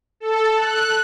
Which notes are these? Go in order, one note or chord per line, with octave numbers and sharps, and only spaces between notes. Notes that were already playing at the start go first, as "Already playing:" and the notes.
A4
F#6